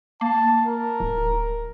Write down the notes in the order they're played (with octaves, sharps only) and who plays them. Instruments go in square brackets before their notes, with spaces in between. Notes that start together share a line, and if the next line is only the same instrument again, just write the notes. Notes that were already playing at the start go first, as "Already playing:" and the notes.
[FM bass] A#3 [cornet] A5
[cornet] A#4
[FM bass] D1